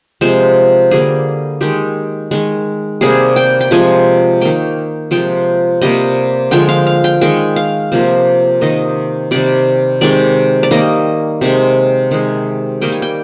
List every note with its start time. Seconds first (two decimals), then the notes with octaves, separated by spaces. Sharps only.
0.21 C3 F3 G#3 C5
0.91 D3 G3 A#3 G#4
1.61 D#3 G#3 G4
2.31 D#3 G#3
3.01 C3 G3 A#3 G#4
3.36 G5
3.61 G5
3.71 C3 F3 G#3 G#5
4.41 D#3 A#3 G5
5.11 C3 F3 G#3 G5
5.81 C3 G3 A#3 D#5
6.51 D3 F3 G#3 G5
6.69 F5
6.87 F5
7.04 G5
7.21 D#3 G#3 G5
7.56 F5
7.92 C3 F3 A#3
8.61 C3 D#3 A#3 D#5
9.31 C3 D#3 G3 D5
10.01 C3 D#3 G#3 D5
10.63 D5
10.71 D#3 G3 A#3 D#5
11.41 C3 D#3 G#3
12.11 D#3 G#3
12.81 D#3 G3 A#3 G5
12.92 G#5
13.02 G5